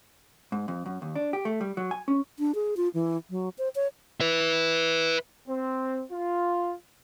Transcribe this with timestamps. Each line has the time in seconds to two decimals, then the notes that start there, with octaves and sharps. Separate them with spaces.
0.52 G#2
0.68 F2
0.86 F#2
1.02 D#2
1.16 D4
1.33 G4
1.45 A3
1.61 G3
1.77 F#3
1.91 G#5
2.08 C#4
2.39 D4
2.55 G#4
2.77 F4
2.94 E3
3.30 F#3
3.58 C5
3.75 C#5
4.21 B4 E5
5.48 C4
6.12 F4